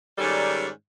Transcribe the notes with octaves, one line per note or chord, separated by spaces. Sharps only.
G#2 D#3 G3 C#4 A4 D5